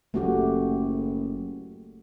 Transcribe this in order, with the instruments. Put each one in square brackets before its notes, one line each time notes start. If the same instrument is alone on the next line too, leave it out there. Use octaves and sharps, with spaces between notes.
[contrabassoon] F#1 [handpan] A3 F#4 G4